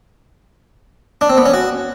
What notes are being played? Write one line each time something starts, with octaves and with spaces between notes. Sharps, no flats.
D4
C4
B3
C#4
F#4